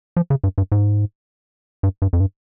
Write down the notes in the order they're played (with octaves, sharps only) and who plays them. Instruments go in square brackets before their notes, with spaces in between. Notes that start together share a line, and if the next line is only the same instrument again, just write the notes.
[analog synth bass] F3
C#3
G2
G2
G#2
G2
G2
F2
G2